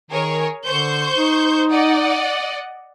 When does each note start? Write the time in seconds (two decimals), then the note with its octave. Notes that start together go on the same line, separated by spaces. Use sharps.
0.11 D#3 G#4 A#4 C#5
0.66 D3 C5 C#6 G6
1.16 D#4
1.71 D5 D#5 F#5